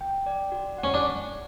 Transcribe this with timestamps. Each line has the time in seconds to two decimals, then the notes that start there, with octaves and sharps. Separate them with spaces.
0.01 G5
0.26 D5
0.52 F#4
0.78 F#5
0.84 C#4
0.94 D4